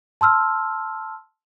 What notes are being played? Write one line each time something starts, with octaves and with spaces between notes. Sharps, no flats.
A5 C6 E6 F6